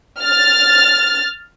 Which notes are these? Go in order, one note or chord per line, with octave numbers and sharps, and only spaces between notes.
F6 A6